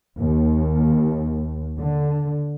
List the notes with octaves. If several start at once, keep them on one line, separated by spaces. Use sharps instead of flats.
D#2
D3